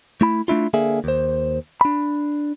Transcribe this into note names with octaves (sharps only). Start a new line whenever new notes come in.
A3 E4 B5
A3 D4 E4 F4
D3 A#3 G#4 E5
D#2 C5
D4 B5